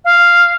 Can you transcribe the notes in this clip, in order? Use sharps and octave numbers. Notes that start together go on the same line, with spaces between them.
F5